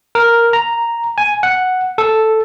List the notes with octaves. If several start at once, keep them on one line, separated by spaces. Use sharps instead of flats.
A#4
A#5
G#5
F#5
A4